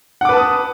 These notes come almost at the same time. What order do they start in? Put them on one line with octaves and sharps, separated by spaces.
F#5 D6 B4 A5 D#6